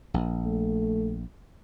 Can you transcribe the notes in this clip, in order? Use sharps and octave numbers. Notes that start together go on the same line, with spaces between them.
A#1
A3